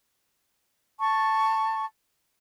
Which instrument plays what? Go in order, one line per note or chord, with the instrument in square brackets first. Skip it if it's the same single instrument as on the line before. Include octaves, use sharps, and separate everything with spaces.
[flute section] A5 C#6